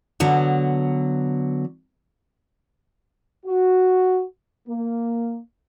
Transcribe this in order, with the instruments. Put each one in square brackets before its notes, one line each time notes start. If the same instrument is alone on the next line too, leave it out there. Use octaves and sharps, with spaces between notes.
[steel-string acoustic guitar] D3 F#3 B3
[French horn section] F#4
A#3